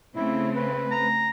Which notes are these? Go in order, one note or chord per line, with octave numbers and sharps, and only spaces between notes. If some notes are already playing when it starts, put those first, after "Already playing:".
C#3 A3 C4 E4
B4
A#5